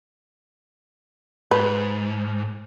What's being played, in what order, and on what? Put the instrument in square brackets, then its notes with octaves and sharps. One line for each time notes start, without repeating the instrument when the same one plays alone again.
[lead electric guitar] G#2 [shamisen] B4